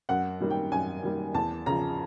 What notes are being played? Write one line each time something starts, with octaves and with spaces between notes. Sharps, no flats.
F#2 F#5
D#3 G3 A#3
G5
F#2 G#5
D#3 G3 A#3
E2 A5
C#3 F3 A#5